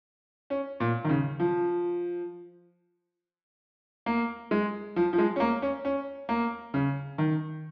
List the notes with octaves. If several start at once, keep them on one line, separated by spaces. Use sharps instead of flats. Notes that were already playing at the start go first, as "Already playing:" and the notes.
C#4
A#2
D#3
C#3
F3
A#3
G#3
F3
F3
G#3
C#4
A#3
C#4
C#4
A#3
C#3
D#3